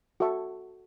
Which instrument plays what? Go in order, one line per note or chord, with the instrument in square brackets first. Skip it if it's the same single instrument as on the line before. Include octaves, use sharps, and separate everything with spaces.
[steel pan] F#4 A4 E5 A5 C#6